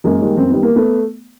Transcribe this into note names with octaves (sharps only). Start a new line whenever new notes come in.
F#2 G#3 A#3
D#3 G3
F#2 C4
D#3 G3 B3
A#3
A3 B3